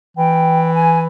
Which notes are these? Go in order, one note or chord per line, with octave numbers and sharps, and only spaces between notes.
E3 G5
G#5